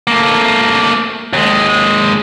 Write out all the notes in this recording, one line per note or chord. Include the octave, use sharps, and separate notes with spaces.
A3 A#3
D#2 G#3